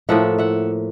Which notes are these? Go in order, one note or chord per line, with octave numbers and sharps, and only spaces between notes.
A2 F3 A#3 E5 F#5
E5 F#5